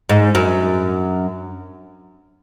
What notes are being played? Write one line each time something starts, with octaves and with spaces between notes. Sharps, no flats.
G#2
F#2